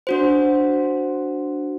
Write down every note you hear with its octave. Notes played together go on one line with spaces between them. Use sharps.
D4 F#4 C5